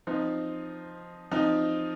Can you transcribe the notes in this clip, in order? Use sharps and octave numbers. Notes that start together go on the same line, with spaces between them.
F3 C4 D#4
F3 C4 D#4